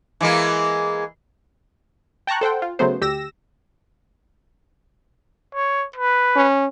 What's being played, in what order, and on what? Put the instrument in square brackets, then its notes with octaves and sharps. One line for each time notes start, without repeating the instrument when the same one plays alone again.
[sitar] E3 G#3 A#3
[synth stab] G5 A5 A#5 C#6 F#6
A4 C5 F#5 G5
F4
C#3 F#3 A3 B3 C5
D2 G4 E6 A#6 E7
[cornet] C#5
B4
[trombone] C#4